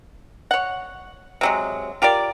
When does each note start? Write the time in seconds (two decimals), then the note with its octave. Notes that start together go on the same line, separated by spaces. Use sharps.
0.51 C#5 F#5
1.41 C3 F#3 G#3
2.02 F4 G4 A#4 D5